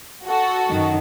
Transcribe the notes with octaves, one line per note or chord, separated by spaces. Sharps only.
F#4 A4
F#2 D#3